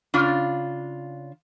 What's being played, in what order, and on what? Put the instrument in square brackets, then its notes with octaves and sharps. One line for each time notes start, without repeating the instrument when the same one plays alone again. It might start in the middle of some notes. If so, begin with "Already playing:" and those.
[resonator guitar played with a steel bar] C#3 D4 F4